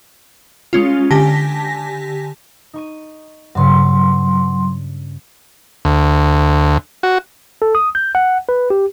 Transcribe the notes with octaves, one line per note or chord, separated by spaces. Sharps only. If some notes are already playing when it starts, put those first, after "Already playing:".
G#3 C#4 F4
D3 G4 G#5 A5 A#6 B6
D#4 C#6 D#7
G2 C#3 F#3 B4 C6
D2
F#4
A4
D#6
G6
F#5
B4
G4